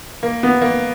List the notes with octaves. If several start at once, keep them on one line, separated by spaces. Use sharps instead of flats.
A#3
B3
A#3